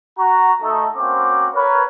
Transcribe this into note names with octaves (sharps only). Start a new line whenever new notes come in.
F#4 A#5
A3 D#4 A4
A#3 C4 C#4 F#4 C5 D6
A#4 B4 C#5